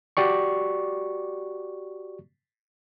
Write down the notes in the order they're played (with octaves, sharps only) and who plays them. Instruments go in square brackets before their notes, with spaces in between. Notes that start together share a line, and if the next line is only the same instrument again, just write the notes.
[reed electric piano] F#4 G4 D5 C#6